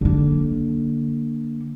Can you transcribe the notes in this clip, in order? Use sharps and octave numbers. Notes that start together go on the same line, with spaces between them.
D3 A#3